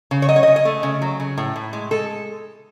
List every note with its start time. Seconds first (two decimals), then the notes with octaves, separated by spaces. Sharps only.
0.11 C#3
0.22 C#5
0.28 F#3 D#5
0.36 C#5
0.43 D#5
0.47 C#3
0.56 D#5
0.65 A3
0.83 C#3
1.02 F#3
1.20 C#3
1.38 A2
1.56 A2
1.73 G#3
1.91 G#3 A4